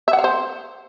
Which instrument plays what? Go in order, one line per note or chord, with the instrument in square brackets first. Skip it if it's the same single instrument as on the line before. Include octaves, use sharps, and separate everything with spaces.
[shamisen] E5
F#5
F5
C5